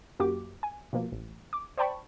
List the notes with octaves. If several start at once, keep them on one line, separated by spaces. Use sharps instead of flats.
F#2 A#3 F#4 G4 D6
G#5
B2 F3 A#3
A1
D6
C5 D5 G5 A5 B5 C#6